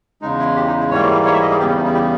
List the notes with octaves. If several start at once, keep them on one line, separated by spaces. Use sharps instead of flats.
E2 C#3 G#3 D#4
E4
G4
D#4
E4
G#2 E3 G3 A#3 C#5
C#5
E5
D#5
G#4
E2 C#3 G3 B3 G4
C#4
D#4
E4
G4